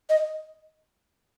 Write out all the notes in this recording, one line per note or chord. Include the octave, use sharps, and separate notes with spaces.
D#5